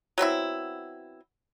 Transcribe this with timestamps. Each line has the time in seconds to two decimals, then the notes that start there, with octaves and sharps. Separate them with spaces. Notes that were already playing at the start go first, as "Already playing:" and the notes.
0.18 F#3 B3 C4 E4